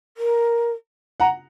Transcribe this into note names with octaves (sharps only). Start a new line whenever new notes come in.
A#4
F#5 A#5